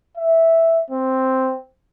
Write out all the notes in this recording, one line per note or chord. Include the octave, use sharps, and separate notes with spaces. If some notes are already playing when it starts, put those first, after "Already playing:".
E5
C4